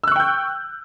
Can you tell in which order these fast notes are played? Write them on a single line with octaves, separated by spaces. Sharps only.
E6 F#6 C#6 G5 G6